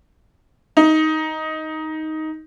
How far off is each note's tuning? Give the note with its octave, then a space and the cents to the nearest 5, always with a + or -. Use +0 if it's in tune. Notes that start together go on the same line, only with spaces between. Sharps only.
D#4 +10